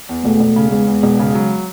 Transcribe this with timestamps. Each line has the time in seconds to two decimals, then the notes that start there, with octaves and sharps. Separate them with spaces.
0.09 E2
0.24 E1 A3
0.40 E1
0.56 C#3
0.71 E2 G#3
0.87 E2
1.03 E1
1.19 C#3
1.35 F#3